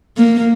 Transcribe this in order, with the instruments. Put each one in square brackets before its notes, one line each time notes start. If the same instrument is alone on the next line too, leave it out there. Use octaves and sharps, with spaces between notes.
[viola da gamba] A#3